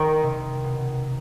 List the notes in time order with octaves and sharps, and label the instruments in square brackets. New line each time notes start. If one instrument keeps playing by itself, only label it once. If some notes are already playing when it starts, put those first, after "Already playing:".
Already playing: [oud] D#3
[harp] C3
B2